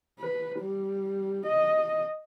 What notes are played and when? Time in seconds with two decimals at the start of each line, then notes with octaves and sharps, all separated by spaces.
0.19 B4
0.59 G3
1.46 D#5